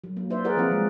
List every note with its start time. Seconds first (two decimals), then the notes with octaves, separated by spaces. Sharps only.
0.04 F#3
0.17 A#3
0.30 B4 C5 D5 E5
0.44 E4 G#4 A#4 B4 D5 F#5
0.57 F3 C4 F4 F#5
0.72 G#3